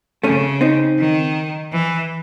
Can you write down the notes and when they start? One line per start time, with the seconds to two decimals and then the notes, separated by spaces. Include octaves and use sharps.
0.23 C#3 A3 C#4
0.61 C4 D#4
0.98 D#3
1.72 E3